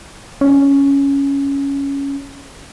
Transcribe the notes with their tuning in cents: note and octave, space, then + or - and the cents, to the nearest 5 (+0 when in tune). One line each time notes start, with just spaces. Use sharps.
C#4 +5